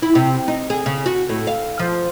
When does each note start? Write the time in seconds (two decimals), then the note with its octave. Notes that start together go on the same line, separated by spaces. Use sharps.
0.02 E4
0.15 C3
0.48 D#4
0.70 G#4
0.86 C#3
1.06 F#4
1.29 A2
1.47 F5
1.79 F3